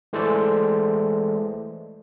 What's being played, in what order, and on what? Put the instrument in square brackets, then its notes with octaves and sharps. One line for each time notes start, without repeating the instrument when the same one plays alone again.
[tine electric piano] E3 G#3 A3 A4 C5 D5